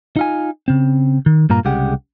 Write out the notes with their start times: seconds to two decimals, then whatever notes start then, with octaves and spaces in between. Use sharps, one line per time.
0.16 D#4 F4 G#5
0.68 C#3 C4
1.26 D#3
1.50 G2 A#2 A#3 A#5
1.65 C2 C#3 G#3 G4 F#5